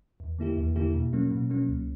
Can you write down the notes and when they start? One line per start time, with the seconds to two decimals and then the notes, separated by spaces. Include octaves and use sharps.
0.20 E2
0.39 D3 A#3 E4 G4
0.57 E2
0.76 D3 A#3 E4 G4
0.94 B2
1.13 F#3 A#3 C#4
1.31 B2
1.50 F#3 A#3 C#4
1.69 C#2